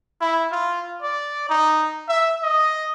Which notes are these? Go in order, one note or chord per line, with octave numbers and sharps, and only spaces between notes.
E4
F4
D5
D#4
E5
D#5